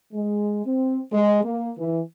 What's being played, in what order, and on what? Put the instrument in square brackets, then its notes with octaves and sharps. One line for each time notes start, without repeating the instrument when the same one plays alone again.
[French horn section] G#3
C4
G#3
A#3
E3